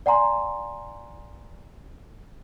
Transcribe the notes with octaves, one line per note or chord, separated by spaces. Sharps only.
D5 F#5 G#5 A#5 C6